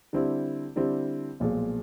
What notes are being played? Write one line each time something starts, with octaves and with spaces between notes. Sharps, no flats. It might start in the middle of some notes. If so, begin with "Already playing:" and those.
D3 G3 C4 E4
D3 G3 C4 E4
B1 A#2 F3 G#3